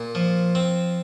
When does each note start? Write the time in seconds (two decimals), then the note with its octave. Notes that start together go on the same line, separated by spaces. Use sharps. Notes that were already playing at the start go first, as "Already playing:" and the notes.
Already playing: A#2
0.15 F3
0.55 C4